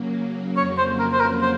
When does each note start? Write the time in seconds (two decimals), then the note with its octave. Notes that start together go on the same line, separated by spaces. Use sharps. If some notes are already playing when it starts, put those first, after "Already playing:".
Already playing: C#3 F#3 A#3
0.57 F2 C#3 F#3 A#3 C#5
0.78 C5
0.99 A#4
1.12 C5
1.20 A#4
1.41 C5